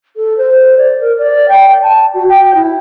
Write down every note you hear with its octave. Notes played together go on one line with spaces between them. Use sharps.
A4
C5
D5
A#4
D5
G5
A5
F#4
G5
E4